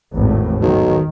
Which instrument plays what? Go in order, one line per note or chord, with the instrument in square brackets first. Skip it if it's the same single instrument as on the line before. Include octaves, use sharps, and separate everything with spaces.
[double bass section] G#1 E2 A2
[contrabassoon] B1 [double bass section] D#3